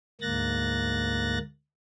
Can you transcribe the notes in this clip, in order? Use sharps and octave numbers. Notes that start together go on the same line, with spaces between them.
D2 G#2 A#3 F#6 A6 A#6